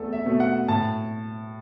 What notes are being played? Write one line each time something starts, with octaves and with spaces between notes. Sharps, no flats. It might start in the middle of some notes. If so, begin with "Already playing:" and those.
Already playing: E2 A3 A4
E5
B2 A3
F#5
A2 A5